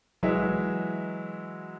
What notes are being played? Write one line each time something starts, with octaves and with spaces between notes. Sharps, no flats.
E3 F#3 G#3 E5